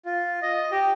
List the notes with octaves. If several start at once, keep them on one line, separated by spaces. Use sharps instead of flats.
F4
D#5
G4